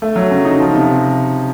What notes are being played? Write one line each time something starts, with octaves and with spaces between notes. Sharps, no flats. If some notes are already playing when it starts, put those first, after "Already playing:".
A3
F#3
C#3
D#4
F3
C3